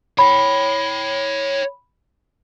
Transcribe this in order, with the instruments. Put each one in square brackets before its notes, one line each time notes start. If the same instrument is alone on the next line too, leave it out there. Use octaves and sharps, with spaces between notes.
[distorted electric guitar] C#5 G5 [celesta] B5